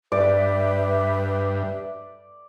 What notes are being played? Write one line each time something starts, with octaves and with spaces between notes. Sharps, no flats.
G2 B4 D5 E5